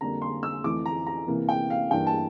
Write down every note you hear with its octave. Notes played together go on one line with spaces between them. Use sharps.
F2 D3 G3 A#3 A#5
C6
E6
F2 E3 A3 D6
A#5
A#5
C3 E3 A#3
G5
F5
G2 E3 A#3 G5
A5